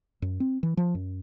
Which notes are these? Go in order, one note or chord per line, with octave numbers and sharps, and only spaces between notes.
F#2
C4
E3
F3
F#2